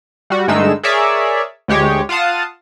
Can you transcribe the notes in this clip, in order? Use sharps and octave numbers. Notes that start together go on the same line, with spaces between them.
G3 F#4
G2 D3 G#3 A3 D#4 E6
G#4 A#4 C#5 D5 E5
D2 G#3 G4 C#5
F4 F5 F#5 A5 D#6